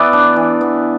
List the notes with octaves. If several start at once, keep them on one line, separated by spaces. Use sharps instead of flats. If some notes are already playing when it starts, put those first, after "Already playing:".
Already playing: E3 B3 B4 D5 E5
D4
E3
B3